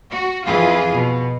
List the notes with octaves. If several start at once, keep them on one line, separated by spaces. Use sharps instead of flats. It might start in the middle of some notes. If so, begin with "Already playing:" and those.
F#4
F2 E3 F4 G#4
B2